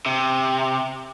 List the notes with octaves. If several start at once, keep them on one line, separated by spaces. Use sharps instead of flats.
C3